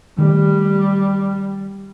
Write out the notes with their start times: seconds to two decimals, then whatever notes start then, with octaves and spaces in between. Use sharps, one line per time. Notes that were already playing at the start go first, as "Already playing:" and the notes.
0.18 D#3 G3 A3